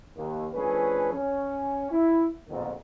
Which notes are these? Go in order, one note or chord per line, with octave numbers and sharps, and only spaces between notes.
D#2
F3 A3 C#4 D4 G#4 B4
C#4
E4
A#1 F2 G#2 B2 D3 D#3